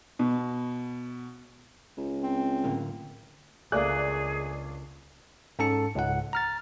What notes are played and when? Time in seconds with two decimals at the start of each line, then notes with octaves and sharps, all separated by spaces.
0.19 B2
1.97 C#2
2.23 C4
2.64 A2 D3 A#3
3.72 C#2 A3 A#3 D4 G#4 D5 G#5 F#6
5.59 G#2 C#4 A4 A5 C#7
5.95 C#2 G#2 F#5
6.33 A#5 F6 A6